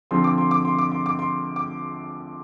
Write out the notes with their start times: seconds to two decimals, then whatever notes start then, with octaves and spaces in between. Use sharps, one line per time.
0.11 D3 F3 C4 C6
0.24 D6
0.38 C6
0.51 D6
0.65 C6
0.79 D6
0.92 C6
1.06 D6
1.19 C6
1.56 D6